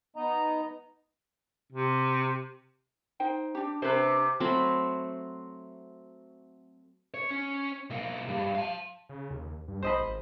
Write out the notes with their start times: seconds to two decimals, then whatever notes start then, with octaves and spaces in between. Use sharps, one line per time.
0.16 B3 D#4 D#5 A#5
1.72 C3
3.20 D#4 C5 G5
3.55 D4 G4
3.82 C3 D4 B4 C5
4.40 F#3 A3 C4 B5
7.14 C#5
7.31 C#4
7.90 B1 A#3
8.28 G2
8.55 F5 A5
9.09 C#3
9.30 D#2
9.68 G2
9.83 B1 C5 D#5 B5
9.98 G#1